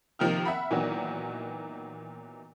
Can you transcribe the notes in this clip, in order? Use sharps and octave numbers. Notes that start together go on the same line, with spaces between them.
C3 D#3 F3 A#3 G5 F6
E5 F#5 B5
A#2 D#3 E3 F#3 B3